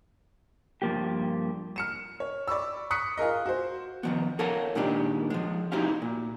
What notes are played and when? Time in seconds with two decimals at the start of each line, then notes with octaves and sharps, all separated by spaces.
0.82 G2 F3 A#3 G4
1.76 F6 C#7 E7
2.20 C#5
2.48 D5 B5 C#6 E6
2.91 C#6 D#6 F#6 B6 C#7
3.17 F4 G#4 A#4 D#5
3.46 F#4 C5
4.03 D#3 F3 B3
4.39 A4 A#4 C#5 F5 F#5 A5
4.75 A#2 D#3 G#3 D4 G4
5.30 F3 G#3
5.72 C4 D#4 E4 F#4 G4 F5
6.02 A#2